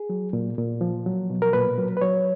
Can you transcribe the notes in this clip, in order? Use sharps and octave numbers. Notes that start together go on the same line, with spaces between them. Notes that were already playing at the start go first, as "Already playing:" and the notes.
Already playing: G#4
F#3
A#2
A#2
F3
F#3
B2
A#4
A#2 B4
F#3
B4
F#3 C#5